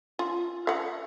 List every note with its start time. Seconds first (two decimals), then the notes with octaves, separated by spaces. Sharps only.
0.19 F4
0.67 F5 F#5